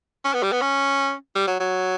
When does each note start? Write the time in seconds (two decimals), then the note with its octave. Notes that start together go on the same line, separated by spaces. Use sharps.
0.25 C#4
0.34 B3
0.43 G3
0.52 B3
0.61 C#4
1.35 G3
1.47 F#3
1.60 F#3